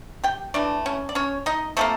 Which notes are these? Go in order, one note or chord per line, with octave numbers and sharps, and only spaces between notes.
G4 G5
E3 A3 D4 D5
C#4 C#5
D5
C#4 C#5
D#4 D#5
C3 F3 A3 A#3 A4